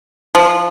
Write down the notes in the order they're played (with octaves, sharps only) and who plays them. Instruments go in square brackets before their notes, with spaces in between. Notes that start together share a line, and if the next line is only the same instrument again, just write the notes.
[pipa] F3